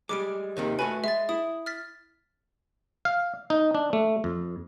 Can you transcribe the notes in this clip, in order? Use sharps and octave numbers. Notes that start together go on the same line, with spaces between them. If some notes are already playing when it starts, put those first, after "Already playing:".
G3 G#3 D6 D7
D#2 C3 D#3
A3 F#4 B4 G#5
G#3 E5 A6
E4 D#6
F6 A6 B6
F5
D#4
D4
A3
F2